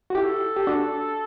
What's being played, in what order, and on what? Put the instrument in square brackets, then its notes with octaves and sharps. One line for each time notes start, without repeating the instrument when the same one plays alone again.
[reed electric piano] F#4
[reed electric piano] E4 G4 [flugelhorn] A4
[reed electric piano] G4
D4 F#4